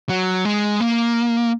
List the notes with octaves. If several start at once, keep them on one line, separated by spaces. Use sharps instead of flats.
F#3
G#3
A#3